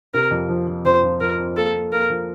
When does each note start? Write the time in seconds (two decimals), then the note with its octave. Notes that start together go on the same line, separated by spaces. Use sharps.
0.14 C3 A#4
0.31 F2
0.49 F3
0.67 F3
0.85 F2 C5
1.04 F3
1.20 F3 A#4
1.39 C4
1.57 A#3 A4
1.74 A#3
1.92 A#3 A#4
2.10 F3